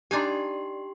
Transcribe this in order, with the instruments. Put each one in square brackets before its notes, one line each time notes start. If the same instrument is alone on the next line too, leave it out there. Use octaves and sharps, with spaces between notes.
[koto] D4 D#4 G#5 [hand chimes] G4 C6